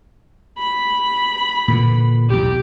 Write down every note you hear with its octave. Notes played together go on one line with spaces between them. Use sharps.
B5
A#2 D3 E3
B1 E2 G4